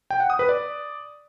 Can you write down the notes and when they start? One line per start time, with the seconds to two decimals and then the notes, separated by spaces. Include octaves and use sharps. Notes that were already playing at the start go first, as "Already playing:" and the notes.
0.10 G5
0.20 F#5
0.30 D#6
0.39 B4
0.49 D5